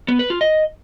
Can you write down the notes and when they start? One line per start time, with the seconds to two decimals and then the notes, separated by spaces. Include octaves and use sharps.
0.08 B3
0.19 B4
0.30 F4
0.41 D#5